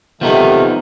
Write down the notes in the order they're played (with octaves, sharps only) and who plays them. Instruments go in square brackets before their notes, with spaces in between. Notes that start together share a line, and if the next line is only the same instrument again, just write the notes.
[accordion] C3 D#3 A3 [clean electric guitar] F3 B3 D#4